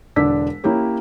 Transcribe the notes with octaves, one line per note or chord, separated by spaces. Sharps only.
E1 D3 D4 D6 E6 B6
A#3 C#4 E4 G4 C#5